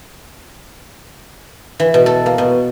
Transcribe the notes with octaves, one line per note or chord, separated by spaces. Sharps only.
E3
B2
A4
A#3
B2